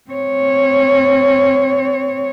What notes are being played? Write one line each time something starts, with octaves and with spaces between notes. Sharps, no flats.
C4 C#5